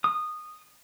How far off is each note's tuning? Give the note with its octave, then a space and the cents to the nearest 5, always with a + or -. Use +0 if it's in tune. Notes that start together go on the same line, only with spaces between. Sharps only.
D#6 -15